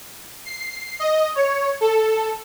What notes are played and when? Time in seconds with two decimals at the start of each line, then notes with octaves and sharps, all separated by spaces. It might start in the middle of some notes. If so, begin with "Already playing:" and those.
0.45 C7
1.00 D#5
1.35 C#5
1.81 A4